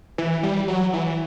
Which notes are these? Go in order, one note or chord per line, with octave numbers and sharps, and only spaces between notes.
E3
G3
F#3
E3